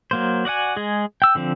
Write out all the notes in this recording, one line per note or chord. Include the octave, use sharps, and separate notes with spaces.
F#3 A#3 C5
F#4 D5 F#5 G#5
G#3 G#4
G5 E6
D3 F3 C4